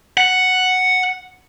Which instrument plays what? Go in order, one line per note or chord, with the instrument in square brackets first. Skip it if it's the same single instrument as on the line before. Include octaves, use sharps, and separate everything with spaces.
[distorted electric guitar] F#5